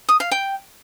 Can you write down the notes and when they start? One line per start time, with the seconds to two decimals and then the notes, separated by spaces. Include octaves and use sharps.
0.09 D#6
0.20 F5
0.31 G5